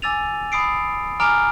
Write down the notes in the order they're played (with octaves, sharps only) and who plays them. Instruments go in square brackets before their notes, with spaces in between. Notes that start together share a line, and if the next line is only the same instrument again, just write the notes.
[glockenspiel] G#5 D6 E6 A6 D#7 F7
B5 D#6 C7 D7
G#5 A#5 D6 F6 D7 F7